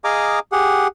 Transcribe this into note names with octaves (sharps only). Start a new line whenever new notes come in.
G#4 D#5 F5 G#5 A#5 D6
G4 G#4 F#5